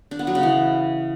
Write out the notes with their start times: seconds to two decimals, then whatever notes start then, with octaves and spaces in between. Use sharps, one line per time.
0.11 D4
0.19 B3
0.27 F#3
0.35 C#3
0.43 E3